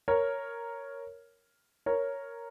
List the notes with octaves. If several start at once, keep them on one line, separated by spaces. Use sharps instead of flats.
A#4 C#5
A#4 C#5